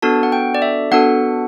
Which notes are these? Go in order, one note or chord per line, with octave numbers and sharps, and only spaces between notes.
B3 D4 F#4 A4 A5
F#5
G5
D5
E5
B3 D4 F#4 A4 F#5